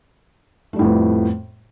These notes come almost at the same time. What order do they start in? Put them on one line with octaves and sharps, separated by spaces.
A3 G3 A2 F2 B3